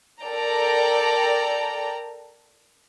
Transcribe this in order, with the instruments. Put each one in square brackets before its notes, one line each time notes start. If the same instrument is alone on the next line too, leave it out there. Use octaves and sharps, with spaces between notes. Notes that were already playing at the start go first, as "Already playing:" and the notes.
[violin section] A4 A#4 D5 G5 A#5